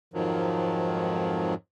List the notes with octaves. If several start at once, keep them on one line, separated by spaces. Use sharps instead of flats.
F2 G#2 D#3 F3 F#3